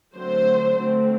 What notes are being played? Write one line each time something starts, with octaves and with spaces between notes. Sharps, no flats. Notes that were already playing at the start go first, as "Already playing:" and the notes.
D3 F#3 A3 C4 C5
D3 A3 C4